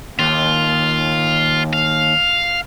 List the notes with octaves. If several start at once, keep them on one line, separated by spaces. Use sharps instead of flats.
D#2 F4
F5